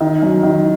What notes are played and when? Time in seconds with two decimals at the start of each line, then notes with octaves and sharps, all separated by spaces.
0.01 D#3
0.23 F#2
0.43 D#3